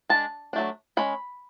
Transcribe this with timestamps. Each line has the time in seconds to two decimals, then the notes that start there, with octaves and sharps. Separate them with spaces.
0.09 G#3 D4 A5
0.53 F#3 A3 D4
0.97 G#3 C#4 B5